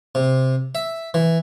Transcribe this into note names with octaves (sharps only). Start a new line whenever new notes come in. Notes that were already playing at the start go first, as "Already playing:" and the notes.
C3
E5
E3